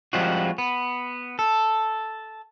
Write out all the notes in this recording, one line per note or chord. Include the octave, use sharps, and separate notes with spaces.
F3 G3 G#3 C4 F4 F#4
B3
A4